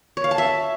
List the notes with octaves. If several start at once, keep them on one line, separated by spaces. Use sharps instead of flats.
C#5
F5
A5
E5